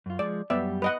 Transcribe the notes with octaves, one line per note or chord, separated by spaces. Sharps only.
F#2 F4
F3 G#3 D5
F#2 G3 B3 G4 D5 E5
B4 D#5 F#5